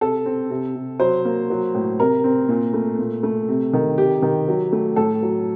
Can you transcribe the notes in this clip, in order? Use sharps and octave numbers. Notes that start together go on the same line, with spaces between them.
C3 A4
C4
C3
C3
F#3 C5
A#3
F#3
A2
C3 A#4
C4
A#2
A3
A#2
A3
C3
D#3
C3 G4
D#3
F#3
A3
A2 A4
F#3